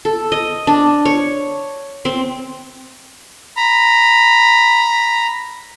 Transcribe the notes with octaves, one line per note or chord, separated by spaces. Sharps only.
A4
D#5
D4
C#5
C4
A#5 B5